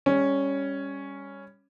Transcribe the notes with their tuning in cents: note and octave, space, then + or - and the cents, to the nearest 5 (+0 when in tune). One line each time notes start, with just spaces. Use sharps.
G3 +25 C#4 +0